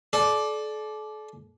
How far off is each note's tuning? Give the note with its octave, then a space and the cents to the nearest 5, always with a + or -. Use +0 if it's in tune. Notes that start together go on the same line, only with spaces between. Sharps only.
A4 -40 D5 +0